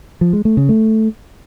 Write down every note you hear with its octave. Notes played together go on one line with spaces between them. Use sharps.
F3
G#3
A3
C#3
A3